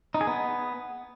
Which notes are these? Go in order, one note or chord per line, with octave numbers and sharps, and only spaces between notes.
D#4
G#4
B3